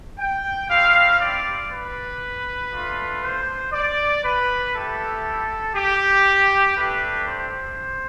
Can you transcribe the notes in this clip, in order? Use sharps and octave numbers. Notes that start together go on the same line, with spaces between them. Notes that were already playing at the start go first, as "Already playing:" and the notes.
G5
C4 E4 G4 F5
D5
B4
A3 D4 F4
C5
D5
B4
A3 E4 G4 A4
G4
A3 D4 G4 B4
C5